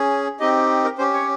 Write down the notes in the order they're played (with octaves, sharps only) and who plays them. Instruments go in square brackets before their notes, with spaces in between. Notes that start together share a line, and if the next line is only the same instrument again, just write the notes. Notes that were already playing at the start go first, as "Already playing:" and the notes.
Already playing: [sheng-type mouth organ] C#4 G#4
C4 D#4 G4 D#5
A#4
C#4 G4 C5
C#5